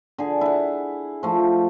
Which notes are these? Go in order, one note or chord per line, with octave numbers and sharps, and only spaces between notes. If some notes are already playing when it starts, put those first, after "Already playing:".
D3 G#4
E4 F#5
F3 A3